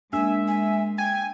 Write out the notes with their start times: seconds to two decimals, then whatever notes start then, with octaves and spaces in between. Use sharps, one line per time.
0.13 G#3 A#3 D4 E5 G#5
0.48 G#5
0.98 G5 G#5